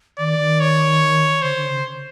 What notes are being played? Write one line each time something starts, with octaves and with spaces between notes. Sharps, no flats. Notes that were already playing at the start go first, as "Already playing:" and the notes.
D#3 D5
D#3
C#5
D3 C5
D3
C#3